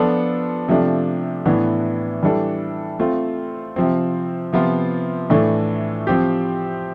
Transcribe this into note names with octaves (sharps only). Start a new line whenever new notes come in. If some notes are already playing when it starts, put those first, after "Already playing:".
Already playing: F3 B3 D4 F4 A4
C3 F3 A3 D4
A2 E3 B3 D4
E3 G3 D4 A4
A3 C4 F4
C3 F3 C4
C3 F3 B3 F4
A2 E3 A3 D4
F3 C4 G4